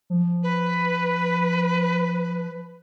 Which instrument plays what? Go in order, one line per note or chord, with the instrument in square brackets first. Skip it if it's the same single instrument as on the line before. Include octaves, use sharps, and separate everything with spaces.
[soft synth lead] F3
[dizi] B4